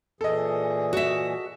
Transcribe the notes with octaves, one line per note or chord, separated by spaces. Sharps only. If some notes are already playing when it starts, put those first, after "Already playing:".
A#2 E3 G#4 A4 D#5
F#4 E5